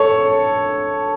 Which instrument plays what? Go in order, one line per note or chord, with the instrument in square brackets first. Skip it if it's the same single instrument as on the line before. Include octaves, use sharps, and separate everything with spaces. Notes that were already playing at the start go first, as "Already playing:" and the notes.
Already playing: [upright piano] A4 C#5